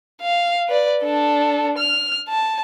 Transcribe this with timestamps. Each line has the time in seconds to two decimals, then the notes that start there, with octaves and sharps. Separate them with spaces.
0.22 F5
0.68 B4 D5
1.03 D4 A4
1.78 F6
2.29 A5